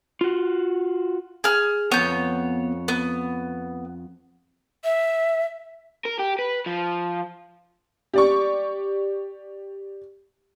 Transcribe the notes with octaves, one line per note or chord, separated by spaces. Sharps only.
F4 F#4
G#4 F6
F2 B3 C#5 G6
B3
E5
A#4
G4
B4
F3
G4 D5 C#6